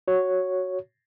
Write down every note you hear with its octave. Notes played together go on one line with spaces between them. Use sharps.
F#4 C#5